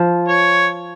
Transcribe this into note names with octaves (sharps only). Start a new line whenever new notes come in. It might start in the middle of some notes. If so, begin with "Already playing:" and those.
Already playing: F3
C#5